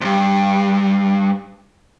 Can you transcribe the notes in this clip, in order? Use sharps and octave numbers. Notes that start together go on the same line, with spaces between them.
D2 G2